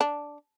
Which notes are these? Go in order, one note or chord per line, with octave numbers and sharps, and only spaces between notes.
D4